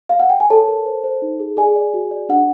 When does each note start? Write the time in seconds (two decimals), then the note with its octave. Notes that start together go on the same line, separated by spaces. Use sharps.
0.09 F5
0.20 F#5
0.30 G5
0.40 G#5
0.50 A4 C#5 A5
0.68 A#4
0.86 C5
1.04 C5
1.22 D#4
1.40 G#4
1.57 G#4 D5 G#5
1.76 D5
1.94 F#4
2.11 D5
2.29 D4 F#5